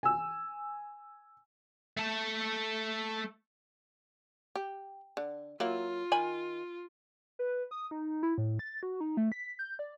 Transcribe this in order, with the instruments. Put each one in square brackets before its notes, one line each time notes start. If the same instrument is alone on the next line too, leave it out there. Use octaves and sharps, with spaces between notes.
[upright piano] G#5 E6
[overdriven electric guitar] A3 A4
[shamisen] G4
D3
[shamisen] F#3 A#3 E4 [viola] F4
[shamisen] D#3 G#5 B5
[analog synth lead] B4
D#6
D#4
E4
A2
A6
F#4
D#4
A3
B6
G6
D5